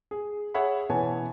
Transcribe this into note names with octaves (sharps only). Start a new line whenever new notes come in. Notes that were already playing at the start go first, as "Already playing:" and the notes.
G#4
G#4 C#5 E5 F#5 B5
B2 E3 B4 C#5 G#5 A5